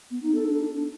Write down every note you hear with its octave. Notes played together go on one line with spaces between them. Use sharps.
B3
D#4
A4
D4